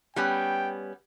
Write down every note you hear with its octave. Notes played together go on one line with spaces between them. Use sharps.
G3 B3 C#4 G5